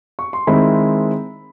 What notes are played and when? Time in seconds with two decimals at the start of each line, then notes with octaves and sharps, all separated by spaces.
0.19 C#6
0.33 C6
0.47 D#3 G#3 C4 E4 B5